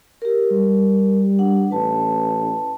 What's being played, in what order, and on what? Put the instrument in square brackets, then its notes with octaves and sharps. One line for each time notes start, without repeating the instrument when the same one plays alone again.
[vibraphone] G4 A#4
[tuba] G3
[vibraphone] D4 F#5
[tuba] A1 [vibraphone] B4 A5